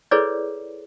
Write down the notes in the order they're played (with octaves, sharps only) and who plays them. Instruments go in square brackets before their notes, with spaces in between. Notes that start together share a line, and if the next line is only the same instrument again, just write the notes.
[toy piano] E4 G#4 A4 B4 C#5 D5